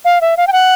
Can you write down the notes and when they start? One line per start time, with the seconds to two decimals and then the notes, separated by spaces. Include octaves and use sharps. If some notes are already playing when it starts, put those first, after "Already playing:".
0.05 F5
0.21 E5
0.37 F5
0.47 G5
0.52 F#5